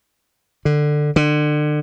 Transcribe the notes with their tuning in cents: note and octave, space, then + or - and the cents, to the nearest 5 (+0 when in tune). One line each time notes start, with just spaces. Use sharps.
D3 +15
D3 +30